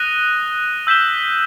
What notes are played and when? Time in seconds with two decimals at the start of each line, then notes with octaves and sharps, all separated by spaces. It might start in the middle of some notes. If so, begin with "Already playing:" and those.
Already playing: D#6 F#6 A#6 D#7 G7
0.87 E6 G6 B6 E7 G7